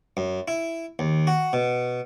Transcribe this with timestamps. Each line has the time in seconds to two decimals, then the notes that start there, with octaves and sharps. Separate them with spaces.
0.17 F#2
0.48 E4
0.99 D#2
1.27 F#4
1.53 B2